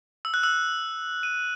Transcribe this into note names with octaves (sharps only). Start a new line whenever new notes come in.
E6
F#6
E6
D#7